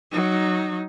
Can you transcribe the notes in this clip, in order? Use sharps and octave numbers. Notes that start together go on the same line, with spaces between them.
F#3 D#4